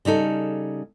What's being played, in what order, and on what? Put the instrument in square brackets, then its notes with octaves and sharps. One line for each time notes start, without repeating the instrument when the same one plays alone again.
[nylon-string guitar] C#3 G3 D#4 A4